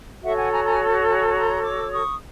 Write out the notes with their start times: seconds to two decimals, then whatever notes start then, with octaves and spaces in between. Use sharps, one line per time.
0.23 F#4 A4 C#5 E5 F#5
0.37 F#5 G#5
0.51 G#5 A#5
0.64 G#5 A#5
1.07 G#5 A#5
1.35 A#5 C6
1.63 D6 E6
1.91 C#6 D#6